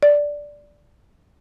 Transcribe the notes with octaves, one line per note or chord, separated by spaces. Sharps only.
D5